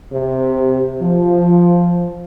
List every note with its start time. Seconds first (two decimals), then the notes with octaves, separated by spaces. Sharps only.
0.12 C3
1.00 F3